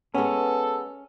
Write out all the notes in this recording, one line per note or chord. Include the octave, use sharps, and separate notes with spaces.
G#3 B3 C#4 A4